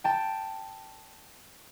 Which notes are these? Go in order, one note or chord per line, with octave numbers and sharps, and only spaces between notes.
G5 A5